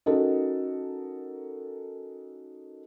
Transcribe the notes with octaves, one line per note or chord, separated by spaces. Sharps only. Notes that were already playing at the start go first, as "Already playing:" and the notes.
C#4 D#4 F#4 A4 A#4 D#5